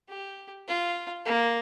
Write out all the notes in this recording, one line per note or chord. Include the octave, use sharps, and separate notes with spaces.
G4
F4
A#3